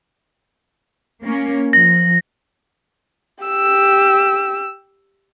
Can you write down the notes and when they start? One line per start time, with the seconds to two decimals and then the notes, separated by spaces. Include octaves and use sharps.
1.25 A#3 C#4
1.73 F3 A#6
3.44 G4 E6